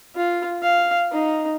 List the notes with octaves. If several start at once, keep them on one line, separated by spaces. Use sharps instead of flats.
F4
F5
D#4